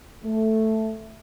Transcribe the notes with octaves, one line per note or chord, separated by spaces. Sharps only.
A3